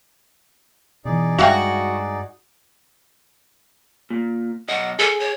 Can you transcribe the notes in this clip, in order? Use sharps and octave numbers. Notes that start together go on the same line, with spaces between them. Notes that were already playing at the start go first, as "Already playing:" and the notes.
B2 E3 D#4 G#4 D5
G2 G#3 F#4 E5 F5 G5
A#2
B1 D#5 F#5
G#4 A4
C#5